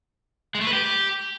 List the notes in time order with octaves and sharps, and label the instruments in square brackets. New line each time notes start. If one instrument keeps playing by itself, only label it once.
[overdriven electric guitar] G#3
A3
B4
G4